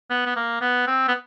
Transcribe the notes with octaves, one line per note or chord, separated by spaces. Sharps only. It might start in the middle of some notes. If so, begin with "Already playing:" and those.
B3
B3
A#3
B3
C4
B3